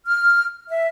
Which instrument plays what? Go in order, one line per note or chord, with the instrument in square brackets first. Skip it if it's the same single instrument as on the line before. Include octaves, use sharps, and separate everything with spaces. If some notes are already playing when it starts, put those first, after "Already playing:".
[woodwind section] F6
E5